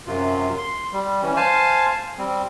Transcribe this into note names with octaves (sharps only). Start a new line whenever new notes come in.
F#2 C3 F4
C6
G3
E3 C#4
C5 F5 G#5 A5
G3 C4